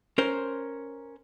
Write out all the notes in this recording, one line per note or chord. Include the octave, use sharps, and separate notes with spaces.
C#4 A#4 C5